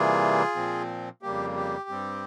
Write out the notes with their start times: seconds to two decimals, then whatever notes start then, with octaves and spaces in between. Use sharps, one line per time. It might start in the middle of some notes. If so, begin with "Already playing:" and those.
Already playing: C3 E3 G3 A#3 F4 G#4
0.56 A#2 F3 C4
1.23 F2 C#3 G3 A#3 G4
1.56 G4
1.89 G2 G3 C4